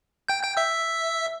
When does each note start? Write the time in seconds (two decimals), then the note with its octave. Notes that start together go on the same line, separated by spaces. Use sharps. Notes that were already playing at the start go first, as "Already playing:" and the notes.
0.28 G5 G6
0.43 G5 G6
0.57 E5 E6